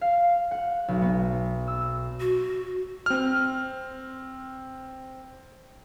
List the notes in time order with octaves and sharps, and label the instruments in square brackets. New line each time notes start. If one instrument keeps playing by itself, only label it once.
[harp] F5
F#5
B1
B3
E6
[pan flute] F#4
[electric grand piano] C4 F6